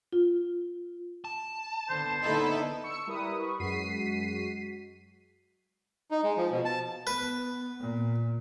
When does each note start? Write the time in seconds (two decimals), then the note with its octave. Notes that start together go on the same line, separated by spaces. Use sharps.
0.13 F4
1.25 A5
1.89 D3 B3 C5
2.23 D3 B3 D#4 E4 A4
2.84 C#6 E6 C#7
3.07 G3 E4 A#4 B4 D#6
3.39 B5 C#6
3.59 F#2 G#3 F#4 B6 C7 D#7
6.11 D#4
6.24 G#3
6.37 F3
6.52 B2
6.65 A5
7.07 B3 B4
7.79 A#2